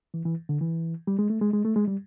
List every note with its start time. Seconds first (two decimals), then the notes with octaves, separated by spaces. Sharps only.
0.14 E3
0.26 E3
0.49 D3
0.61 E3
1.07 G3
1.19 G#3
1.30 A3
1.41 G#3
1.53 G#3
1.65 A3
1.76 G#3
1.88 G3